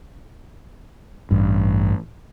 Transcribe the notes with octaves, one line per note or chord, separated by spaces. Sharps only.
A1 G2